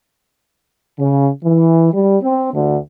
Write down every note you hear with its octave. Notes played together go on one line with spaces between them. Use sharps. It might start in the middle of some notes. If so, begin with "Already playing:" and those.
C#3
E3
G3
C4
D2